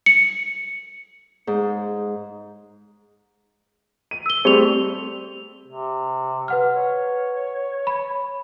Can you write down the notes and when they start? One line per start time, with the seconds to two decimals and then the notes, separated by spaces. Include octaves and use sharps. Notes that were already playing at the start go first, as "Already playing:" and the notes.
0.06 C#7
1.47 G#2
4.11 D#7
4.26 E6 G7
4.45 G3 A3 C4 G#4 F7
5.67 C3
6.48 B4 F#5 F6
6.75 C#5
7.87 B5